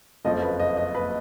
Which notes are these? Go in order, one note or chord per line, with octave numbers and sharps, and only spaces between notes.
F#1 F2 F3 D#5
B4
D#5
D#5
B4